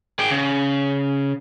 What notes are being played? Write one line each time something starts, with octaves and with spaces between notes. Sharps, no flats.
G#4 G5
C#3